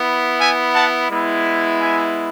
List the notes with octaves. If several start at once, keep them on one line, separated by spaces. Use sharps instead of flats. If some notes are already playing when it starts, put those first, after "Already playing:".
Already playing: B3 E4
E5 G#5
F#5 A5
G#3 B3 E4
E5 G#5